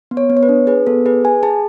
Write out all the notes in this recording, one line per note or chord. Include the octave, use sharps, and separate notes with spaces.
B3
C#5
B3
C#5
B4
D4
G#4 B4
B3 A4
G#4 B4
G#4 G#5
G#4 A5